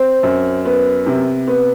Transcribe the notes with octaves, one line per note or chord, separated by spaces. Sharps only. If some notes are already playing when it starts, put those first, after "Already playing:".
Already playing: C4
F#2
B3
C3
B3